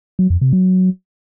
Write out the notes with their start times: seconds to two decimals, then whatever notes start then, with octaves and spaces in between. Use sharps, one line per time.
0.19 F#3
0.30 F2
0.41 C3
0.53 F#3